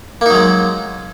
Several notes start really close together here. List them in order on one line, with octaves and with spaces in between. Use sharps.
A#3 D#4 F#3 G#3